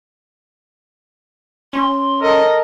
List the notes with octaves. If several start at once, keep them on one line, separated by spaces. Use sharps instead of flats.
C#4 C6
A4 A#4 D#5